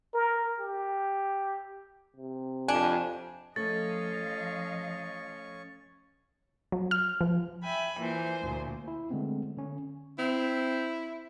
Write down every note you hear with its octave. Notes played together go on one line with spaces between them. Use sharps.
A#4
G4
C3
F2 D4 G#5
F3 A3 C#4 D#5 F5 C#6 A6
F#3
F6
F3
E5 G5 G#5 B5
A#2 E3 C5 G#5
D2 A#2
E4
D3 G#3 A3 B3 C4
D3 C#4
C4 E4